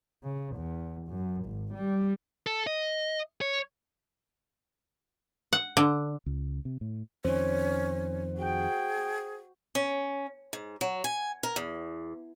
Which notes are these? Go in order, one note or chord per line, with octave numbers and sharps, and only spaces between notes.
C#3
E2
F#2
G#1
G3
A4
D#5
C#5
F#5
D3
C#2
C3
A2
F2 D#3 C#4 C5
F#4 G#4 G5
C#4
G#2
F#3
G#5
A#4
E2